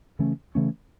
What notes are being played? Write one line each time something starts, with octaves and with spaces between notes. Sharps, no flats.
C#3 E3 A3 C#4
C#3 E3 A3 C#4